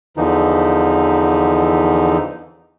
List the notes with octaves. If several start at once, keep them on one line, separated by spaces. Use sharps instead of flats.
E2 D3 E3 F3 D#4